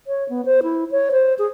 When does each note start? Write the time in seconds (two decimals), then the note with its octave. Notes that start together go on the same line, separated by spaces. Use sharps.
0.07 C#5
0.29 B3
0.46 C5
0.63 E4
0.91 C#5
1.12 C5
1.39 G#4